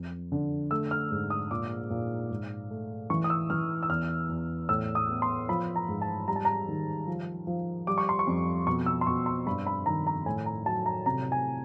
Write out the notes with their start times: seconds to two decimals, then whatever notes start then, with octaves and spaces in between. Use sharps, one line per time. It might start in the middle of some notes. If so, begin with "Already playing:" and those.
Already playing: F2
0.32 D3
0.71 A3 E6
0.91 F6
1.11 G#2
1.30 D#6
1.51 A#2 D6
1.90 A#2
2.30 G#2
2.70 A3
3.10 E3 C#6
3.24 D#6
3.30 E6
3.50 E3 F6
3.83 E6
3.89 E2 F6
4.29 E2
4.69 A2 E6
4.95 D#6
5.09 B3
5.22 C6
5.49 F3 B5
5.76 A#5
5.88 G#2
6.02 A5
6.28 G3 A#5
6.36 A5
6.45 A#5
6.68 D#3
7.07 F3
7.47 F3
7.87 G3 D6
7.98 C#6
8.09 C6
8.19 C#6
8.27 F2
8.67 B2 C#6
8.86 E6
9.01 C6
9.07 B2 C#6
9.26 C6
9.46 G2 B5
9.67 B5
9.86 D#3 A#5
10.07 A#5
10.26 A2 G#5
10.46 A#5
10.66 F#3 A5
10.86 A#5
11.06 C3 A#5
11.32 G#5